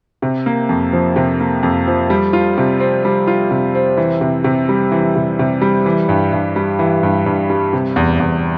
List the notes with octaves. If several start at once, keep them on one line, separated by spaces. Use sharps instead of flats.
C3
A#3
F2
F3
C3
A#3
F2
F3
G3
F4
C3
C4
G3
F4
C3
C4
E3
C3
C3
G3
E3
C3
C3
G3
E3
G2
G2
G3
E3
G2
G2
G3
C3
E2
E2